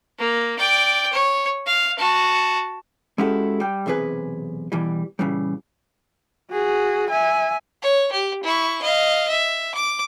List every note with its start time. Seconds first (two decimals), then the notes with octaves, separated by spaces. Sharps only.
0.19 A#3
0.58 D5 G5
1.12 C#5
1.66 F5
1.98 F#4 A5
3.18 G#3 C#4 E4 F#4 G4 A4
3.60 G3 G5
3.86 B1 E2 C3 G#4 B4 G#5
4.72 B2 E3 G3
5.19 A#2 C#3 E3 G3
6.51 F#4 G#4
7.10 E5 G#5
7.82 C#5
8.12 G4
8.44 E4 C#6
8.82 D#5 F5
9.30 E5
9.75 D6